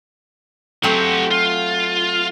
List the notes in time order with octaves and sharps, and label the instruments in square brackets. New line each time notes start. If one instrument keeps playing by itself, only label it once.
[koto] F#3 A3 C4 [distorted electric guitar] G4 F#5
[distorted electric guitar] F4